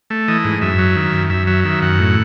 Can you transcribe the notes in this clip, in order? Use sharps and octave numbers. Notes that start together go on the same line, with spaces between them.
A3
E3 D#5
G#2
F#2 E5
F#3
D#3
F#2
F#2 E5
F#3 E5
D#3 E5
F#2 F#5
A2